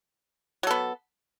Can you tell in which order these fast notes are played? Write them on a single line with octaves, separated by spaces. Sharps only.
F#3 A4 B3